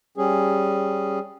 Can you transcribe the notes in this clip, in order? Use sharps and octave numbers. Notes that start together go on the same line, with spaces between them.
G3 C#4 G#4